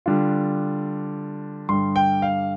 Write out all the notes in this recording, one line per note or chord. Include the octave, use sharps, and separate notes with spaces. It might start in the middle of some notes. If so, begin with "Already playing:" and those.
D3 G3 D4 F4
G2 D3 G3 C6
G5
F5